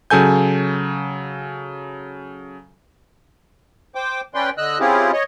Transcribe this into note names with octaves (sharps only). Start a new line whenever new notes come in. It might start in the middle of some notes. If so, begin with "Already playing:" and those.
C#3 F#3 A4 G#5 G6
C5 G5 D6
C#4 B4 D5 G5 C6
D3 D#5 E6 F#6
C4 C#4 E4 F4 G4 G#4
C#5 D#5